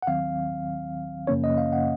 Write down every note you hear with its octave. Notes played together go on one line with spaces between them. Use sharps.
F#5
D#2 D#3 F#3 C4 F5
F#2 C#3 F3 A#3 C#4 C#5
D#5
F5
F#5